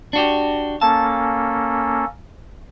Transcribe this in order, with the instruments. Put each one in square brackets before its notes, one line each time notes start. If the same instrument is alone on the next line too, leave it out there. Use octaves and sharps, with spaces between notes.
[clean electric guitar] D4 F#4 G4
[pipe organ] A#3 C#4 A4 [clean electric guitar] A5